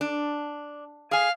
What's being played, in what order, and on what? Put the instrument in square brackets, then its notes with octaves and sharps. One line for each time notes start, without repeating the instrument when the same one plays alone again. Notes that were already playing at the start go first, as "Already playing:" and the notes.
[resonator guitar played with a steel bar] D4
[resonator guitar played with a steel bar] G#4 G#5 [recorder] F5